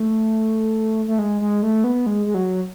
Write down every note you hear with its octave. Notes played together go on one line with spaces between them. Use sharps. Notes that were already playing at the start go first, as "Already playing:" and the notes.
Already playing: A3
A3
G#3
G#3
A3
B3
G#3
G#3
F#3